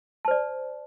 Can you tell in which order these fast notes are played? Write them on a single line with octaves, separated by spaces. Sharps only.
A5 C5 D5